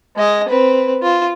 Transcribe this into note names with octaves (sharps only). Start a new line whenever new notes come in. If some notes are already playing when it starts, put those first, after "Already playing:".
G#3 D#5
C4 B4
F4